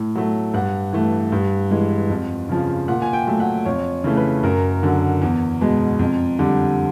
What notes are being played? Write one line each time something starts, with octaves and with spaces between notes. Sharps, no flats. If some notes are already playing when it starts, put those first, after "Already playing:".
Already playing: A2
F#3 A3
G2 F#5
E3 A3
G2
E3 G#3
F2
C#3 F3
A#2 F#5
G#5
G5
F#3 A3
F#5
F2 C#5
C#3 E3 A3
B4
F#2 A#4
D3 F#3
E2
B2 G#3
F2
D3 G3